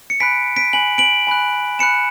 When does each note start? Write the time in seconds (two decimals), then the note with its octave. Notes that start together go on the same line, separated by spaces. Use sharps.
0.10 C#7
0.20 G#5 B5 F#6 B6 D7
0.56 B6 D7
0.73 G#5 B5 F#6 F#7
0.98 D7 F#7
1.27 G#5 B5 F#6
1.79 G#5 B5 F#6 C#7 E7